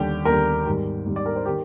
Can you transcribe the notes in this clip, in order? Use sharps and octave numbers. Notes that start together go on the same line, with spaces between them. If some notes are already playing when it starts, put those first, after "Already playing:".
Already playing: D#2 D3 G3 G4
D#2 D3 G3 A#4
G#2 D#3 G3
G#2 D#3 G3
D5
A#4
C5
D#3 G4